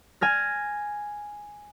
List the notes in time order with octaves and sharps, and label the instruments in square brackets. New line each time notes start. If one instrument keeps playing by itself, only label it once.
[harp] G#5 F6 A#6